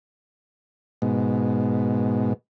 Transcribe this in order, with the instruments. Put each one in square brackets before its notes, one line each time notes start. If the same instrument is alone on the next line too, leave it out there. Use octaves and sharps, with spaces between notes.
[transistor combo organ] G#2 B2